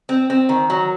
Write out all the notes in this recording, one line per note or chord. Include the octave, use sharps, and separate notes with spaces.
C4
C4
D#3
F#3